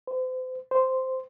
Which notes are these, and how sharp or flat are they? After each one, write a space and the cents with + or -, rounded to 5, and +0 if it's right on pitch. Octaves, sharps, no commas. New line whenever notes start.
C5 -35
C5 -5